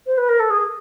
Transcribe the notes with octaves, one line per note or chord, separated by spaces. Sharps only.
C5
B4
A#4
A4
G#4